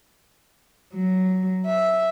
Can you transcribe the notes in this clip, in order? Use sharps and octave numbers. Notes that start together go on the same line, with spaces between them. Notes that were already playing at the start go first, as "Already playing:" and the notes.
F#3
E5